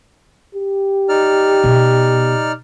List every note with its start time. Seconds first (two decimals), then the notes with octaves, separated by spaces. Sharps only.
0.55 G4
1.09 D#4 D5 F6
1.64 B2